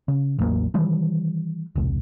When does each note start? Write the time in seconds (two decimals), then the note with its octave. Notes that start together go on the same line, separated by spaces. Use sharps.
0.08 C#3
0.39 A1 E2 F#3 A#3
0.74 D#3 E3 G3
1.75 E1 C2